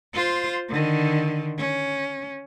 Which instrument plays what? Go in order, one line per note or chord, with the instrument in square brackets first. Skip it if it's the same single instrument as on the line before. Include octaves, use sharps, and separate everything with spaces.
[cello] F4 C5
D3 D#3
C#4